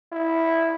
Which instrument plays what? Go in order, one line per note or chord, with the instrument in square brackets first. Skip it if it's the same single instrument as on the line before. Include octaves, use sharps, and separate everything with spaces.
[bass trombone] E4